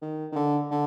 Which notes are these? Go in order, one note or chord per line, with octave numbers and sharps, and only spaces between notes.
D#3
D#3
D3
D3